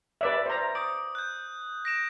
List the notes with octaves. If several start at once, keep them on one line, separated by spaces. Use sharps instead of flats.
B4 D5 E5
C5 A#5
D6 D#6
F#6 G6
A#6 D7 E7